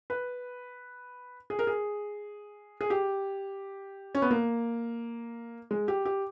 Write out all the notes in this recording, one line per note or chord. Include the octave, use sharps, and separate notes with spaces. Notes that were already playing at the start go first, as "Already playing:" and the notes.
B4
G#4
A#4
G#4
G#4
G4
C#4
B3
A#3
G#3
G4
G4